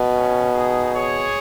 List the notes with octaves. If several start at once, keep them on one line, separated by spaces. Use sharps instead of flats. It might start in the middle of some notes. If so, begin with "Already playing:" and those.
Already playing: B2
C#4
D#4 G#4
G#4 C#5